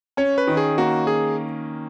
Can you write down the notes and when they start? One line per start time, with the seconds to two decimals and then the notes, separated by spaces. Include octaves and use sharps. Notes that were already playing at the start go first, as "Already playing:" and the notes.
0.17 C#4 C#5
0.38 B4
0.48 D#3
0.57 G#4
0.78 A#3 F#4
1.07 G#4